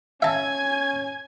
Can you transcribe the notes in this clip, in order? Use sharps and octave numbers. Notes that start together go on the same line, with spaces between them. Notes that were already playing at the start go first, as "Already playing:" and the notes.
C#4 E5 G#5 A5 G#6